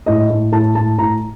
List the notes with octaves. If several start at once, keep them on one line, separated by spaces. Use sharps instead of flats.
A2 D#5
A2
A2 A5
A2 A5
A2 A#5